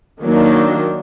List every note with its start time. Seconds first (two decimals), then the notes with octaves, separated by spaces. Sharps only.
0.22 D#3 F#3 A#3 D4